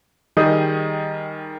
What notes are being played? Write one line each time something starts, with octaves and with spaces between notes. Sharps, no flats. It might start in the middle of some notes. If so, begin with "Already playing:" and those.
D#3 G3 G#4 D#5 D#6 G6